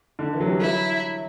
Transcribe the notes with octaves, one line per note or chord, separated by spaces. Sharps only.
D3
E3
F#3
G3
F#3 E4